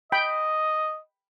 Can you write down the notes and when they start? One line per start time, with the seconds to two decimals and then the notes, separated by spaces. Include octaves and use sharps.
0.12 D#5 G5 B5